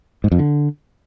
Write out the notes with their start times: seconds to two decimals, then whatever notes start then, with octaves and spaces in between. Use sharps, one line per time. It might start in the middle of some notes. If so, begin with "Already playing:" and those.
0.24 G#2
0.32 F2
0.39 D3